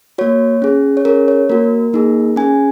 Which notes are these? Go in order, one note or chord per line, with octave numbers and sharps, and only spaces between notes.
A#3 F#4 C#5
C#4 G#4
C#5
C#4 G#4 A#4
C#5
A#3 F#4 A#4
A#3 D#4 G#4
C#4 G#4 G#5